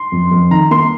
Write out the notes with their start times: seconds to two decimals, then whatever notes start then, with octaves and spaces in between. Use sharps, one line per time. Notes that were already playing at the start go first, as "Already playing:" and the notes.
Already playing: C6
0.12 F2
0.31 F2
0.51 D#3 A#5
0.71 A#3 C6